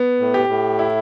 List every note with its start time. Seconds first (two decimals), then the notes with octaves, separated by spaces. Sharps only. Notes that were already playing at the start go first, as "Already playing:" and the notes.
Already playing: B3
0.20 A2
0.34 G4
0.49 A2
0.79 E4